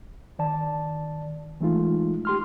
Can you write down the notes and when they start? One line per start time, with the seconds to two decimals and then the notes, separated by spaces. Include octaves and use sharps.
0.39 D#3 D5 A5
1.61 E3 G#3 A3 D#4 F4
2.25 G4 C6 F6